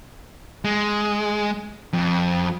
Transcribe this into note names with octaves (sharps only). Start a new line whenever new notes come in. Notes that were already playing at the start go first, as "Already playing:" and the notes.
G#3
F2